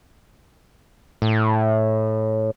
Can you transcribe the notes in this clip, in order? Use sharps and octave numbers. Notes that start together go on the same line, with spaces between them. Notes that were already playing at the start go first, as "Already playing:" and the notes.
A2